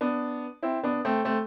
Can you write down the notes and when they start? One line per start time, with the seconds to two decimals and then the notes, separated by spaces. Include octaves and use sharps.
0.01 B3 D4
0.63 C4 E4
0.83 B3 D4
1.05 A3 C4
1.25 A3 C4